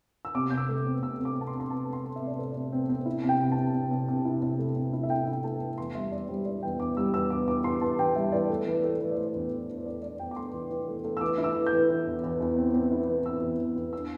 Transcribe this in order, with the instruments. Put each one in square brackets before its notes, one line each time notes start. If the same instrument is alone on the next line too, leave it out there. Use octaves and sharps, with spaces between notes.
[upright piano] E6
C3 D6
C3 G6
E6
A3
C4
C3 E6
C4
D6
C3 A5
C6
C3
C6
C4 A5
A3
C6
A3
C3 E5
D5
A3 C5
C3 D5
C4
C4
E4
C3
G5
C3
A5
C3
C3
C3
C3
E4
C3
A3
C3
E4
E5
C3 G5
E4
G5
A3 A5
E4
E2 C6
G3 E5
E2 D5
G3 C5
G3 D5
E2 G5
E2 D6
G3 E6
E2 E6
E2 D6
E3 D6
E2 C6
E3 A5
E3 G5
G3 E5
E3 D5
A3
E3
A3
E3
D5
A3 C5
E2
E2
E2
C5
A3 D5
A3 D5
E2 G5
D6
A3 C6
E3
E3
A3
A3
E6
E3 D6
E4
E6
E3
G6
E3
E3
E2
E2
E2
C4
C4
E4
E3
C4 E6
E2
E2
E2
D4 E6